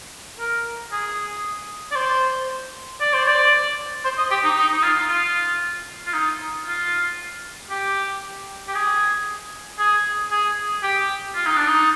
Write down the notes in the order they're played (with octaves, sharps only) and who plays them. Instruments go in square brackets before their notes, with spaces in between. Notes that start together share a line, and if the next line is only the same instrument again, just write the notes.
[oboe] A#4
G#4
D5
C5
D5
C5
D5
C5
D#5
G4
D#4
D#4
D#4
F4
F4
F4
D#4
F4
G4
G4
G#4
G#4
G#4
G4
F4
D#4
D4
D#4